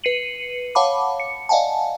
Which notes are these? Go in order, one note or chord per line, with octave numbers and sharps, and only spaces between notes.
B4 C7 C#7 D#7 F#7
C#5 F5 F#5 A5 B5 D6
C#7
D5 D#5 F5 F#5 G#5 A5